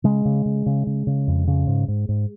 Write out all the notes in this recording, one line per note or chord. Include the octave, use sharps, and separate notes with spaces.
C#3 G#3
C#3
C#3
C#3
C#3
C#3
F2
C#3
G#2
G#2
G#2